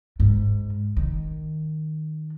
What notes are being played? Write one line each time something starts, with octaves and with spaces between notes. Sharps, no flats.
G#2
D#3